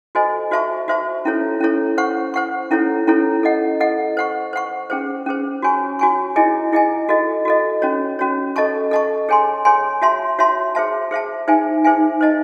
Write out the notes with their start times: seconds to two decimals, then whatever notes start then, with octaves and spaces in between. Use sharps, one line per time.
0.15 F#4 A4 C5 D#5 G#5
0.51 F#4 C5 E5 A5 C#6
0.88 F#4 C5 E5 A5 C#6
1.25 C#4 E4 A4 C#5
1.61 C#4 E4 A4 C#5
1.98 C5 F#5 C#6
2.34 C5 F#5 C#6
2.71 C#4 E4 A4 C#5
3.07 C#4 E4 A4 C#5
3.43 A4 D#5 F#5
3.80 A4 D#5 F#5
4.17 C5 F#5 C#6
4.53 C5 F#5 C#6
4.90 C#4 G#4 C5
5.26 C#4 G#4 C5
5.62 F#4 C#5 G#5 C#6
5.99 F#4 C#5 G#5 C#6
6.36 E4 G#4 D#5 G#5
6.72 E4 G#4 D#5 G#5
7.09 F#4 A4 D#5
7.45 F#4 A4 D#5
7.82 C#4 F#4 C#5
8.19 C#4 F#4 C#5
8.56 A4 D#5 A5 C#6
8.91 A4 D#5 A5 C#6
9.29 G#4 C#5 G#5 C6
9.65 G#4 C#5 G#5 C6
10.02 F#4 C#5 E5 A5 C6
10.39 F#4 C#5 E5 A5 C6
10.75 G#4 C5 E5 A5
11.11 G#4 C5 E5 A5
11.48 D#4 G#4 C5 E5 G#5
11.85 D#4 G#4 C5 E5 G#5
12.21 C5 D#5 A5